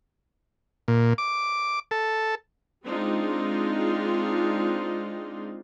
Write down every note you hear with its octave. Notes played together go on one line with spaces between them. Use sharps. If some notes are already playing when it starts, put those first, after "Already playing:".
A#2
D6
A4
G#3 C4 D4 D#4 F4